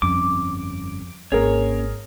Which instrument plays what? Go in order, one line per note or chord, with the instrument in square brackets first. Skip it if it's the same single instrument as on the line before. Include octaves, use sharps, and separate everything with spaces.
[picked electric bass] G1 G3 C#4 [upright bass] F2 [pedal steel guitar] D6
[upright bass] G#1 [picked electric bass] A#3 C#4 [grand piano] G#4 A#4 [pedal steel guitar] C#5